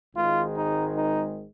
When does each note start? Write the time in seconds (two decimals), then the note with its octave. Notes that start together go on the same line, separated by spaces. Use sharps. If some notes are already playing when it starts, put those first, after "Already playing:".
0.15 G#1 G#2 D#3 G#3 F4
0.56 D#4
0.97 D#4